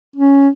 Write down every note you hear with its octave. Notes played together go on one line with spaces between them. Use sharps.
C#4